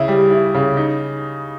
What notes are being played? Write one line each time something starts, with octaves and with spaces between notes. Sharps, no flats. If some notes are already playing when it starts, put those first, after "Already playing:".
Already playing: C#3 E4
G3
E4
C#3
D#4